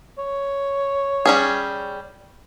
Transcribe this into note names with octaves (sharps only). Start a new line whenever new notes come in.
C#5
G3 C#4 G#4